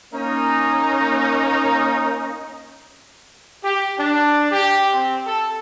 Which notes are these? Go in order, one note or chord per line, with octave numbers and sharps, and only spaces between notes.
A#3 C#4 D#4
G4
D4
G4
C4
A4